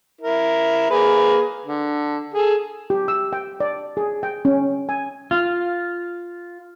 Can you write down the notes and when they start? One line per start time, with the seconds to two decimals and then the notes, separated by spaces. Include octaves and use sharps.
0.21 E4 A#4
0.91 A#3 G#4 B4
1.65 D3
2.34 G#4 A4
2.90 G4
3.08 E6
3.33 G5
3.60 D5
3.97 G#4
4.23 G5
4.45 C#4
4.89 G#5
5.31 F4